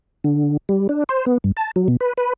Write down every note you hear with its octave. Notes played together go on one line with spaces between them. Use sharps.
D3
G3
D4
C5
B3
G2
A5
F#3
B2
B4
B4